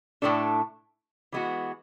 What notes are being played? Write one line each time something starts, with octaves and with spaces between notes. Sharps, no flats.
A2 E3 A3 D4 A4
E3 G#3 B3 F#4